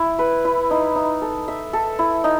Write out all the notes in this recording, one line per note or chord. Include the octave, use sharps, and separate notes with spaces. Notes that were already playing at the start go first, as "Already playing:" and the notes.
Already playing: E4
B4
E4
D#4
D#4
A4
E5
A4
E4
D#4